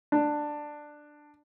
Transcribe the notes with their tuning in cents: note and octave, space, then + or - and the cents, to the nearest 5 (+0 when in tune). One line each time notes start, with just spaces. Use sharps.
D4 +10